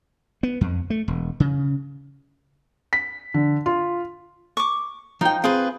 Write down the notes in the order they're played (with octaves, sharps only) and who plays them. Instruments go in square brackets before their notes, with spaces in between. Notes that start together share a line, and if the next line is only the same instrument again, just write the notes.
[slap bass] B3
F2
A3
E1
C#3
[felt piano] B6
D3
F4
[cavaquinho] C#6 D6
[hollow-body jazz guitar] F3 G5 [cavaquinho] D#4
[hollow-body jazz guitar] C4 [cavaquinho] F4 G#4 B4